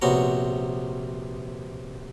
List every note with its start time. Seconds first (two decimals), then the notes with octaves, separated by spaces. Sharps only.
0.02 A#1 C3 B3 C#4 F#4 A#5